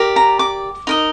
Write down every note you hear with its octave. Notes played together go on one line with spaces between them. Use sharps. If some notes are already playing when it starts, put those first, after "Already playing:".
Already playing: G4 A#4 D5
A#5
D6
D#4 A#4 D#5